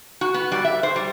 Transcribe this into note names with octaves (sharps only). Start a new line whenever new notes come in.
F#4
B3
G3
E5
C5
G3